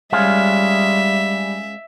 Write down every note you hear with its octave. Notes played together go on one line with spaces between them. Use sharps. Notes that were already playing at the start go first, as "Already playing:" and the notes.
G3 G#3 C#4 F4 E5